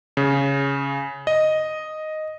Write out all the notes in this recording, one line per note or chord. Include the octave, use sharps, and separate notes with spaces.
C#3
D#5